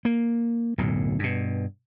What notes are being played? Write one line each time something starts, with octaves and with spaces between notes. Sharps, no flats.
A#3
D1 B1 F#2 A2
G2 B2